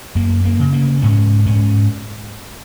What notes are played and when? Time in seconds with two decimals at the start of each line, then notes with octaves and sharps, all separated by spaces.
0.15 F#2 A#3
0.45 A#3
0.60 C#3
0.73 A#3
1.02 G#2 C#4
1.46 G#2 C#4